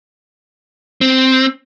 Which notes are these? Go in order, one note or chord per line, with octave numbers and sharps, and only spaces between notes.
C4